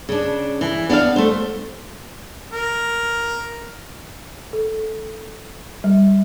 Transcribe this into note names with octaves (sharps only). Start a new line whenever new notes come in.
C#3 D4
E3
B3 D4 D5 F5
A3 C5
A#4
A4
G3